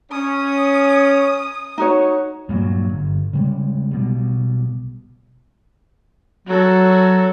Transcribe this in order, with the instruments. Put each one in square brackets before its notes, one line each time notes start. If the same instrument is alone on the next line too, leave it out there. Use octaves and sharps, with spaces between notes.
[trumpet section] C#4 [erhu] D#6
[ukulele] D#4 F#4 C#5
[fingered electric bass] G2 A#2 F#3
G1
C#3 G3 G#3
B1 B2 G3
[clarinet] F#3 [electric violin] F#4 A4